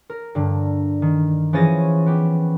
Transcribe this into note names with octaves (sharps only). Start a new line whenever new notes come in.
A#4
G2 D3
D#3
E3 F3 C#4 G#4 A6 A#6
B3 G4